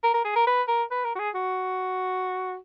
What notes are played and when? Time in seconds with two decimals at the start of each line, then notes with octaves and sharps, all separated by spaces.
0.04 A#4
0.14 A#4
0.24 G#4
0.36 A#4
0.47 B4
0.68 A#4
0.91 B4
1.04 A#4
1.15 F#4
1.19 G#4
1.34 F#4